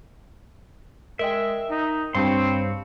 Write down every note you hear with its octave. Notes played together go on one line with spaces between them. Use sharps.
G#3 A#4 D#5 E5 G5
D#4
G2 C4 C#5 F5 A5 B5 C6